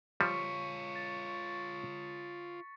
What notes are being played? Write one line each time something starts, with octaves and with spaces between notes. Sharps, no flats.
F3 G3 F4 C#5 C#6 B6 C#7
A6